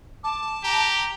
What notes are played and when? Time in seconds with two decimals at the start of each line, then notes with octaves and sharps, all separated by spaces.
0.24 A5 D6
0.64 G4 A#5